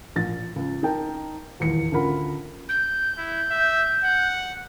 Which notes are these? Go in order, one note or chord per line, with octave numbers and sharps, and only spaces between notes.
A#1 A6
C#2
D#4 A#4 G5 A5
D#1 E2 C#7
D2 C#4 F4 A#4 F#5 B5
G6
E4
E5
F#5